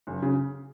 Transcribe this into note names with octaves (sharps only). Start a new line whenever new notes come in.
F#1
C#3